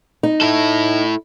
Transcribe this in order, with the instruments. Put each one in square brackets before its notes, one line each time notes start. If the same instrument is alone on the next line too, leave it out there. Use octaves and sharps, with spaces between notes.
[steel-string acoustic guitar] D#4
[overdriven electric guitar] E4 A4